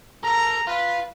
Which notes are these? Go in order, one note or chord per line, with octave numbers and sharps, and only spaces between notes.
A4 A#4 A#5
F4 B4